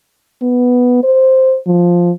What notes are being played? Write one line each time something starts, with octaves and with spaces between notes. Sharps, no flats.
B3
C5
F3